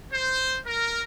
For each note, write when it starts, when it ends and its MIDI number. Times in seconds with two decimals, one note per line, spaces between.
0.12 0.57 72
0.65 1.02 70